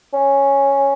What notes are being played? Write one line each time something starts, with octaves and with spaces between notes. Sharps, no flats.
C#4